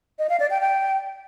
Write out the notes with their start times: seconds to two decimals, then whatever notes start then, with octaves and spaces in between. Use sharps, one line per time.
0.19 D#5
0.29 F5
0.40 D5
0.50 G5
0.61 G5